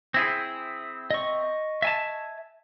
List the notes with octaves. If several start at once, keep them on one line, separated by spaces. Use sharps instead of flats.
C4 E4 G#4
D#5 C#6
E5 G#5 A5